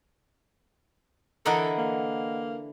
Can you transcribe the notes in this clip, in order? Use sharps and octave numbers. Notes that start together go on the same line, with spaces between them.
D3 E3 A4 A#4 D#5 F#5
A#3